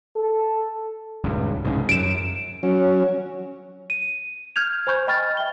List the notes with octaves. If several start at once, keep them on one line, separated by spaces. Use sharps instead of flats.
A4
D#1 C#2 G2
C2 G#2 C#3
F#2 D7 E7
F#3 C#4
D#7
F6 G6 G#6 F7
C5 G#5 B5 C#6 G6
D#5 G5 B5 C#6 F6 A6
E5 G5 G7